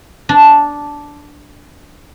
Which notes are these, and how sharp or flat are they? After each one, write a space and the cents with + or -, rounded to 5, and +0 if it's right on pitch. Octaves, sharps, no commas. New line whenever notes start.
D4 -5